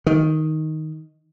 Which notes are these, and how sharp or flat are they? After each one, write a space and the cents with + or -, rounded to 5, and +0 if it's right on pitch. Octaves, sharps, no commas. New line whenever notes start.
D#3 +5